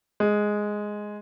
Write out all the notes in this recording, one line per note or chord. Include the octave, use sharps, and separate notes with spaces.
G#3